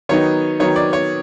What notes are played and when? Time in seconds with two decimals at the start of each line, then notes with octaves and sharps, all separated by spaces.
0.09 D#3 F#3 B3 D#4 C#5
0.60 D#3 F#3 B3 D#4 C#5
0.76 D5
0.93 C#5